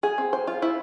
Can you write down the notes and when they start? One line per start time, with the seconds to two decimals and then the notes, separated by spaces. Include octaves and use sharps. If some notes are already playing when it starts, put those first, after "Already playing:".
0.03 G#4
0.18 C4
0.33 C5
0.47 F4
0.62 E4